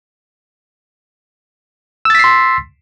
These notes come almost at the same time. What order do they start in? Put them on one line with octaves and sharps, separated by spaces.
E6 A6 B6 C7 C6